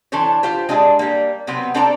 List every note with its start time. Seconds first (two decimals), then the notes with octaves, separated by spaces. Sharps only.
0.12 E3 D4 A4 C5 C#5
0.43 F4 G4 C5
0.69 G#3 D4 G#4 A4 D#5
0.99 G3 A#3
1.47 C3 F#3 B3 C4
1.74 C4 D4 A4 C5 D5 A#5